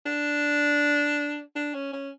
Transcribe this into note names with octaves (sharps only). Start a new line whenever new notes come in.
D4
D4
C#4
C#4